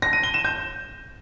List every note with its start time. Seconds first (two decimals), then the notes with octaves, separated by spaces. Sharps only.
0.02 A#6
0.13 D#7
0.23 G7
0.34 E7
0.45 G6